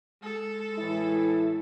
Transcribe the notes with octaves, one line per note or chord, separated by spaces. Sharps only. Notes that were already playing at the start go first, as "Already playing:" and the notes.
G#3 A4
A2 E3 E4